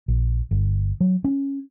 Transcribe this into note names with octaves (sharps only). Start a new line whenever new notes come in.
A#1
G1
F#3
C#4